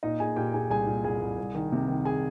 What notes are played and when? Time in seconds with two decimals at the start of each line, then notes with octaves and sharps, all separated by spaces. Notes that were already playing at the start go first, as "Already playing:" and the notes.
0.03 A#2 D#4 D#5
0.20 A#2 G#4 G#5
0.36 A#2 G4 G5
0.54 A#2 G#4 G#5
0.70 C2 G#4 G#5
0.87 A#2
1.04 C2 G#4 G#5
1.22 C2
1.38 C2
1.55 D#3
1.72 C3
1.88 D#3
2.05 G#4 G#5